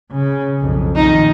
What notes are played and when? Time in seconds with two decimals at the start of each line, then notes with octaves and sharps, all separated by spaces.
0.11 C#3
0.59 B1 F2
0.96 A#1 D#3 D#4